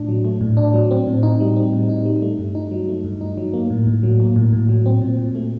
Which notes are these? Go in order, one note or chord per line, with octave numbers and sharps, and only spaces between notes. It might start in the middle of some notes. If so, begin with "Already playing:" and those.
Already playing: A2 A3 D4
F#3
A3
A2
D4
F#3
C4
A2
D#4
G3
C4
A2
D#4
G3
A3
G2
D#4
F#3
A3
G2
D#4
F#3
A#3
A2
A2
F#3
A#3
A2
A2
F#3
C4
A#2
A#2
A3